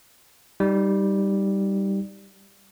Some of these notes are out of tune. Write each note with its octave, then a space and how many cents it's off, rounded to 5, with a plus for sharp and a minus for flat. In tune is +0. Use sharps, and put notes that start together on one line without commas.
G3 +0 D#4 +10